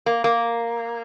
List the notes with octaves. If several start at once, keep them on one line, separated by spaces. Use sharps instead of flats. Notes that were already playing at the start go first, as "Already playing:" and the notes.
A#3
A#3